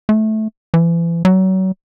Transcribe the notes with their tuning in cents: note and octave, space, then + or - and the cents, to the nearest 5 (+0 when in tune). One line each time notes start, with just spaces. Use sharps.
A3 -15
E3 +35
F#3 +30